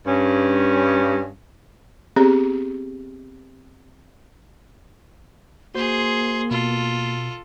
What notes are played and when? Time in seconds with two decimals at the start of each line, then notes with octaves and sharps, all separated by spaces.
0.06 G2 C#4
2.16 B3 C4 G4 G#4 A#5
5.75 A#3 F#4 G#4 C5 C6
6.51 B2 F4 A4